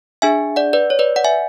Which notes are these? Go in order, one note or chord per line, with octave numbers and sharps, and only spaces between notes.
D4 G#4 E5 G#5
D5 F#5
B4 D5
C#5
B4 D5
D5 F#5
E5 G#5